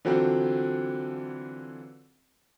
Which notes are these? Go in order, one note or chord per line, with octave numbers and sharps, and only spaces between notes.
D3 E3 F#3 C4 F4